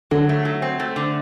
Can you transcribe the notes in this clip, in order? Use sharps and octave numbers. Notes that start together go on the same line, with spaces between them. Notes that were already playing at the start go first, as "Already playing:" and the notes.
D3 F#3
A3
F#3
C4
A3
D3